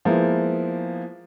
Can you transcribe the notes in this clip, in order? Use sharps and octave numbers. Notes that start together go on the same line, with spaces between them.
F3 G#3 A#3 B3 E4